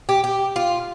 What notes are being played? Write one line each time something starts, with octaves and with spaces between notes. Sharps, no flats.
G4
G4
F4